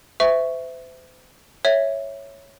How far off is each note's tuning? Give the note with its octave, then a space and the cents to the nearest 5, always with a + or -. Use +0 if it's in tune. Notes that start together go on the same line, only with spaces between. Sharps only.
C5 -40 E5 +0 C#6 +0
C#5 +0 E5 +0